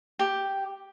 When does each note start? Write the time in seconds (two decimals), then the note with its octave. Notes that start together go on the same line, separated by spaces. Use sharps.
0.19 G4